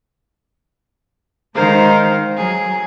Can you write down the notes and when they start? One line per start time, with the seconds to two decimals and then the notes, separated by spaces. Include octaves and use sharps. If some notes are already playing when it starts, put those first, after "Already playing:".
1.55 D#3 G#3 D#4 A#4 C5 F5
2.37 F#3 G#4